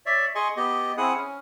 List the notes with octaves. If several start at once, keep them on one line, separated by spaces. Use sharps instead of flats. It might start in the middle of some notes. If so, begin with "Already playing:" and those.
C#5 D5 E5
G#4 D#5 G#5 C6 C#6
B3 G4 D#5
C4 E4 G#4 F#5 D#6
C#4